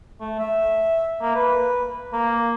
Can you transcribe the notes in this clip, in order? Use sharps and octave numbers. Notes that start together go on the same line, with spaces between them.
A3
E5
A#3
B4
A#3